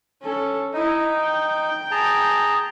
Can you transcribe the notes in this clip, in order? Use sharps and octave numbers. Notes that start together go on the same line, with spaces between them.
C#4 A4
D#4 E4 D#5
G5
G#4 A5 A#5